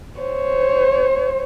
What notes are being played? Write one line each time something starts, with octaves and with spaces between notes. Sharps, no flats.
C5 C#5